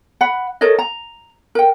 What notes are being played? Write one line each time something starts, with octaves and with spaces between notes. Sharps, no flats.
F#5 B5
A4 A#4 C#5 D#5
A#5
A#4 G5